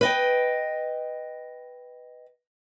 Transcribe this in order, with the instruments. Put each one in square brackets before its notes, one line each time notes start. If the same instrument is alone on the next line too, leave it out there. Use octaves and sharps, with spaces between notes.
[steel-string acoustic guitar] B4 D#5 G5